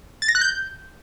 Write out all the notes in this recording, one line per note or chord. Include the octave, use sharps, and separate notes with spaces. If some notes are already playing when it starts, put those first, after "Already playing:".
A6
A#6
F#6
G6